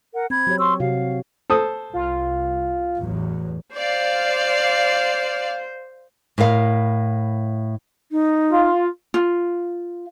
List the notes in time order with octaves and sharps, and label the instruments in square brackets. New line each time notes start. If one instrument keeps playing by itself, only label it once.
[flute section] A#4 F#5
[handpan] C4 [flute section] B5 G#6
[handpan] F#3 G4 C#5
[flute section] C6 C#6 E6
[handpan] C3 F#4 [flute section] F5
[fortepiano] A4 C5 D#6
[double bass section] C2 [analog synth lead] F4
[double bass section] A1 E2 F#3
[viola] C5 [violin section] D5 F5
[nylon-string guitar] A2 E4 A#4 F5
[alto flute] D#4
[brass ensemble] F4
[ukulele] F4